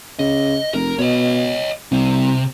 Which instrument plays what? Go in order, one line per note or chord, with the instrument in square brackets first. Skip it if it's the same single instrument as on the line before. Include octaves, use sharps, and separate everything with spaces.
[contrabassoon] C#3 [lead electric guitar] D#5
[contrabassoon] F1 [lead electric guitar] A#4
[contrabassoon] B2 [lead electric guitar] C#5 D#5
[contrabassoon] C2 [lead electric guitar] C3